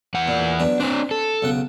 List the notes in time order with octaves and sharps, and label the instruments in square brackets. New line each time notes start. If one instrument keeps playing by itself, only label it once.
[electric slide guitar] E2 F#5
[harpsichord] A#2
F#3 B3 D4
[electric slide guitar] C4 D4 [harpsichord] C5
[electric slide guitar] A4
[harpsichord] B1 C#3 F#5